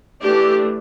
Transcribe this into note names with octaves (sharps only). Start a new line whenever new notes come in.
E3 A3 D4 G4